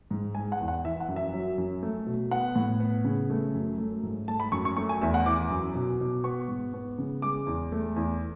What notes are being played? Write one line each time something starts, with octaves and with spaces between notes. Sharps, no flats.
G#2
G#3 G#5
F#5
E2
F#5
E3 E5
F#5
F#2
E5
F#3
F#2
A3
B2
B3 F#5
A2
B3
C#3
A3
F#2
A3
G#2
A3 A5
B5
F#2 C#6
C#6
A3 C#6
G#5
E2 E5
F#5
E3 D6
F#2
B2
B2
B3 C#6
G#2
B3
C#3
G#3 D6
E2
A3
E2